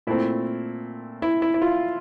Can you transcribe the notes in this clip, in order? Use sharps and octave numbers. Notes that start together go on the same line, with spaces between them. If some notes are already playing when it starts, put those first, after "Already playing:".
A#2 A3 C4 E4
E4
E4
E4
F4